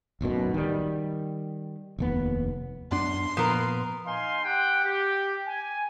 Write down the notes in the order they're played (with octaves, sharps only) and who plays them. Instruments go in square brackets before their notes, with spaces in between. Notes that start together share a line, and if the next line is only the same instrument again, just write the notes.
[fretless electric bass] D1 B1 F#2 B2
D#3 G3
F1 D#2 B3
[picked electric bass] F#2 B3 D4 [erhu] C6
[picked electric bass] A#2 F3 [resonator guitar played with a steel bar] B3 A#4
[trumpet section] D#4 F5 G#5 C6
G4 F#5 G5
G4
G#5